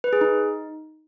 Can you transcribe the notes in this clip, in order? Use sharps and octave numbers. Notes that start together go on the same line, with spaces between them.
B4
G#4
D#4